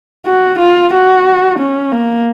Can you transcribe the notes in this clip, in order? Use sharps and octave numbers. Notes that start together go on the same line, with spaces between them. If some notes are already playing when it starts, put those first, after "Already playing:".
F#4
F4
F#4
C#4
A#3